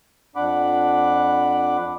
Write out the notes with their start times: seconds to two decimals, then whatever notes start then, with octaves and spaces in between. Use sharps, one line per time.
0.36 F2 D4 F#5 B5 D6